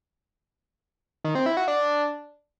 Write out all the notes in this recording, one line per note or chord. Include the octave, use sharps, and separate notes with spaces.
D#3
C4
E4
F#4
D4